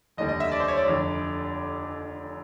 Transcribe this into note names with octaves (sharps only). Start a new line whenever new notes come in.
F1 D#2 D3 G3 D#5
D#5
E5
D5
C5
C#5
D5
F1 F2 D3